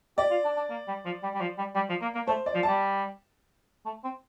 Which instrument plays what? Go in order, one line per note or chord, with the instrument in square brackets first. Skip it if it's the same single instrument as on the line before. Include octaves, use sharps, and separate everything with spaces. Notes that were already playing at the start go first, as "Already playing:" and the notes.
[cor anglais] G4 [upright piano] D5
[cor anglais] F4
D4
D4
A#3
G3
F3
G3
G3
F3
G3
G3
F3
A#3
A#3
[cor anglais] A3 [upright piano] C5
[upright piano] D5
[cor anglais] F3
[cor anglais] G3 [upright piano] A5
[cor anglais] A3
C4